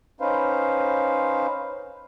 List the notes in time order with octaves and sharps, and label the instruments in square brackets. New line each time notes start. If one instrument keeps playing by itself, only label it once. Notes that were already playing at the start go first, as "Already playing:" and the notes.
[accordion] C#4 D#4 B4 C5 F5